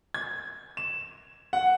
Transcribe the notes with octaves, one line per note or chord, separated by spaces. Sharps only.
G#6
E7
F#5